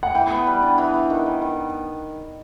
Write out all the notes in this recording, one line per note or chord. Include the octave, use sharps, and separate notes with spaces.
F#5
E3 G5
B3
G3
D4
E3
E3
D#3
D#3
D#3